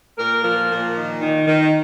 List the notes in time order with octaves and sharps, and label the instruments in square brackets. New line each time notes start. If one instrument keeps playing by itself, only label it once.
[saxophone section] A#2 A#4
F3 A#4
A#2
D#3
D#3
D#3